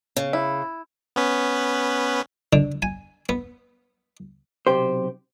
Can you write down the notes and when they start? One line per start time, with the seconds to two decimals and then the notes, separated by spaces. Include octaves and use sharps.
0.16 C#3
0.33 E4
1.16 B3 C#4 B4
2.53 D3
2.82 G#5
3.29 B3
4.67 B1 C3 G4 C5